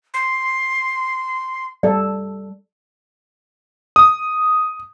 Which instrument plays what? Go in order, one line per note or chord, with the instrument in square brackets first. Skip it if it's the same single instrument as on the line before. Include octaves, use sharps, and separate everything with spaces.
[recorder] C6
[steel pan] G3 A4 [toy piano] D5
[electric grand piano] D#6